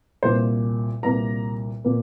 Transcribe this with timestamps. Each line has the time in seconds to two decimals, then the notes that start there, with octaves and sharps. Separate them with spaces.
0.23 C2 A#2 A#3 C5
1.03 C2 A#2 A#3 A#5
1.84 A#2 A#3